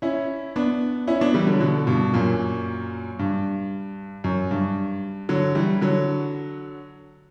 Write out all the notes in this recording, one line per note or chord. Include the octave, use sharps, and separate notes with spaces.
C#4 E4
B3 D4
C#4 E4
B3 D4
E3 G3
D3 F#3
B2 D3
G2 B2
F#2 A#2
G2
F#2
G2
D3 F#3
E3 G3
D3 F#3